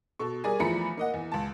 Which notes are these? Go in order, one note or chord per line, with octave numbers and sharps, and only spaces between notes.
B2 A4 C#6
G3 G#4 A#4 D5 G#5
E2 F3 A3 A#5 B5 C#7
A#3 D#5 F#5
E2
C#2 A5